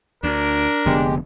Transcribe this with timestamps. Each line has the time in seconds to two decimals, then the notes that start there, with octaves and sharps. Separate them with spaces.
0.23 D2 D4 A#4
0.86 F1 D3 G#3 B3 G4